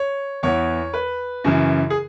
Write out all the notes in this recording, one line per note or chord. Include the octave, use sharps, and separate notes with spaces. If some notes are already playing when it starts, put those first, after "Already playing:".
Already playing: C#5
E2 E3 B3 C#5
B4
F#2 C#3 E3
G#4